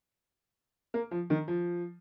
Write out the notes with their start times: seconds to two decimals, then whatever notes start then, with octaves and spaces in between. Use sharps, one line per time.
0.94 A#3
1.11 F3
1.30 D#3
1.48 F3